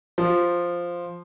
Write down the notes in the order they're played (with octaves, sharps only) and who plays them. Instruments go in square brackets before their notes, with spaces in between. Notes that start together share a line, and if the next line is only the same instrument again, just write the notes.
[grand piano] F3